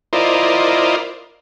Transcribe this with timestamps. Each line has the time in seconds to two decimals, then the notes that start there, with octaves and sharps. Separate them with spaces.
0.13 E4 F4 A#4 C5 D5 D#5